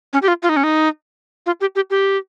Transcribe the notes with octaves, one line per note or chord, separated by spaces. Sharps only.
C#4
G4
F4
F4
D#4
C#4
D#4
F4
G4
G4
G4